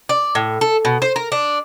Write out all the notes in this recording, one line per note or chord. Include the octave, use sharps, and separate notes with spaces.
D5
A2
A4
B2
C5
A#4
D4